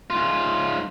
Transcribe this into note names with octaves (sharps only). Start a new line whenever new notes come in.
G#2 F4